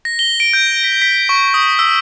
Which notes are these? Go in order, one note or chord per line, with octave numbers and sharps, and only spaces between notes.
A#6
G7
D7
G6
B6
B6
C#6
D#6
E6